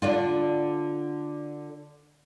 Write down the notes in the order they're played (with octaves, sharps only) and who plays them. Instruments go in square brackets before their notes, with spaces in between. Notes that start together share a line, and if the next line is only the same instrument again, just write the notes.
[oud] D3 D4 F4